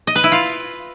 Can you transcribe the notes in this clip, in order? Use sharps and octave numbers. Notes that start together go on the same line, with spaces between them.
D#5
B4
E4
F4